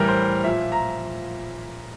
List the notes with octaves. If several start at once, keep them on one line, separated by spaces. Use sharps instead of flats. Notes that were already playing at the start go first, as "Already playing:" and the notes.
Already playing: A2 E3 G3 A#4
C5
A#2 F3 E5
A#5